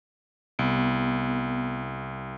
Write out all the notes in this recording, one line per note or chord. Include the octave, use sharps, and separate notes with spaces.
C2 B3